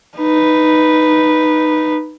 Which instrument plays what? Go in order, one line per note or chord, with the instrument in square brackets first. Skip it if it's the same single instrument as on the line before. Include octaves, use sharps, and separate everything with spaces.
[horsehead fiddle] D#4 B4